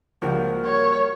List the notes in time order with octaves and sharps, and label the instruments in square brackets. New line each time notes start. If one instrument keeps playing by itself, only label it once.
[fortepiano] C#2 F3 [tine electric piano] G3 A#3 F#4 [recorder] A#4
[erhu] C#5